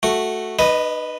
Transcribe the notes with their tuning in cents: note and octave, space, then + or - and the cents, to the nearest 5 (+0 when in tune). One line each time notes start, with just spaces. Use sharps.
A3 +0 F#4 +0
D#4 -45 B4 +0 D#5 +5